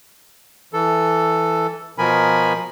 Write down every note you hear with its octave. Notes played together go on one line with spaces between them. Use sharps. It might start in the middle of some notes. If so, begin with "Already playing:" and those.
E3 A4
B2 F3 A#4 G#5 B5